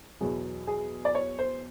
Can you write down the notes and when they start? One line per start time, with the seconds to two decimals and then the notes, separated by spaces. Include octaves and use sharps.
0.21 E2 B2 F#3 G#4
0.67 G#4
1.05 D5
1.15 C#5
1.39 C5